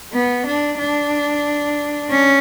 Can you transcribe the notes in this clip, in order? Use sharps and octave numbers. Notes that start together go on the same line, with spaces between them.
B3
D4
D4
C#4